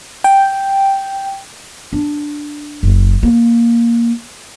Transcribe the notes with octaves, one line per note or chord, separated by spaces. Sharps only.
G5
D4
F#1
A#3